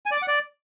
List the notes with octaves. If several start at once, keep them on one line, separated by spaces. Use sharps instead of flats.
G#5
D5
D6
F#5
D5